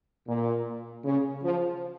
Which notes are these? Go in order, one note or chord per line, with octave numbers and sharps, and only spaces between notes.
A#2
C#3
F3